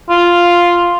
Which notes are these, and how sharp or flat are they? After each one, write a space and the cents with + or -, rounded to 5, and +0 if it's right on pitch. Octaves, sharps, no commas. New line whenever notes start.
F4 +0